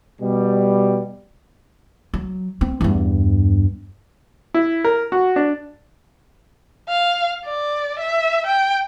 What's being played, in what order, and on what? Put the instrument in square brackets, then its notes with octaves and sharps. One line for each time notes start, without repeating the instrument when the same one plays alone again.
[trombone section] B2 G3
[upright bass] F#3
C4
E2 G2
[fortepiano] E4
A#4
F#4
D4
[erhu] F5
D5
E5
G5